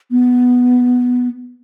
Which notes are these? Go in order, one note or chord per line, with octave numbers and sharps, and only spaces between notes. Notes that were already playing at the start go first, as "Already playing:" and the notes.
B3